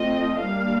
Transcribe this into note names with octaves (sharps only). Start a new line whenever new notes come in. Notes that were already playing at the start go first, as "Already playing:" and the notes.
Already playing: F3 A3 C4 D#5
G3 A#3 D4 F5